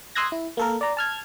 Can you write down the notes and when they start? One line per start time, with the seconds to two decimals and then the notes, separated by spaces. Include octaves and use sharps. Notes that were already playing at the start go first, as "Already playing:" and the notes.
0.15 C6 D#6 E6 F#6 G#6 A#6
0.32 E4
0.57 A#3 A4 A#4
0.81 D5 A#5
0.97 A5 F6 G#6